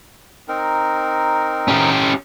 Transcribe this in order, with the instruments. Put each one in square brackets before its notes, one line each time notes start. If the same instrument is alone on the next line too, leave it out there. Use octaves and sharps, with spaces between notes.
[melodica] C4 D#4 A#4
[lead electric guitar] C#4 G4